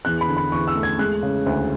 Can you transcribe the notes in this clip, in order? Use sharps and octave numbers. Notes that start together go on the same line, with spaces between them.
E2 F#6
B5
D3
B5
E2 C#6
E6
A3
G#6
G#3 F#6
C#3
D2